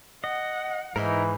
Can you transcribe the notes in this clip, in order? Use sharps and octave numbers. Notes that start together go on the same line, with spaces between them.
D#5 F#5
G#2 E3 D#4 E4 A#4